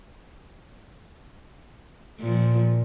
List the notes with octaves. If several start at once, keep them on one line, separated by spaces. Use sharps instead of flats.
A#2 F3